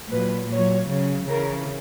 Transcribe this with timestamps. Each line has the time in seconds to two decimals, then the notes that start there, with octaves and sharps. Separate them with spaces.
0.11 A#2 F#3 B4
0.50 A#2 F#3 C#5
0.89 C#3 F#3
1.27 C#3 E3 A#4